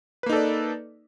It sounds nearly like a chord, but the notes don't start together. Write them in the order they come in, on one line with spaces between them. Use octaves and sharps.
B4 A#3 D#4 A4 D5